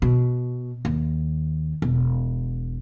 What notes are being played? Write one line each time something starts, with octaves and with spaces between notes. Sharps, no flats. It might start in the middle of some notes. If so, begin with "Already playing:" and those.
B2
D#2
E1